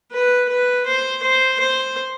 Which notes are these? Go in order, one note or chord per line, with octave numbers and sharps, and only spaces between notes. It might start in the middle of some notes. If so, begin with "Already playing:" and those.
B4
B4
C5
C5
C5